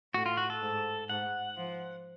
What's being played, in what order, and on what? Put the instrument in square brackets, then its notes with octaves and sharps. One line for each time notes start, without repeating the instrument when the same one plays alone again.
[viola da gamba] A2 [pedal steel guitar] F#4
[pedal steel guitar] F4
F#4
A4
[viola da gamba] G#2
[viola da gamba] G#2 [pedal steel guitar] F#5
[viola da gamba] F3